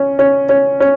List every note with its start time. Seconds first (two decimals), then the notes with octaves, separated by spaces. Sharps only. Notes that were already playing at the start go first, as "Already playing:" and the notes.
Already playing: C#4
0.19 C#4
0.49 C#4
0.80 C#4